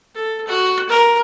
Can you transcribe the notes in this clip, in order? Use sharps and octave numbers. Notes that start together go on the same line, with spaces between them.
A4
F#4
A#4